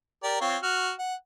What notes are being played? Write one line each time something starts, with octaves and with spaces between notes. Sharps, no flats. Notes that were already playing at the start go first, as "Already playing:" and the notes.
G4 A#4 D5
C4 F4 C#5
F#4 F6
F#5